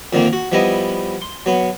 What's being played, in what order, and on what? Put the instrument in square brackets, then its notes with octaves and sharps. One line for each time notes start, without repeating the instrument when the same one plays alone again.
[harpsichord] F2 A#2 D3 D#3 A#3
F#4
F3 G3 B3 E4 D#5
C6
F#3 B3